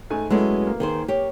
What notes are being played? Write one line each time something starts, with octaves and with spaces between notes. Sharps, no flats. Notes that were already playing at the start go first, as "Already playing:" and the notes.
G#2 A3 G#5
F#3 G#3 A3 B3 C#4 E4
A#3
D#3 G#4 C5
G4 C#5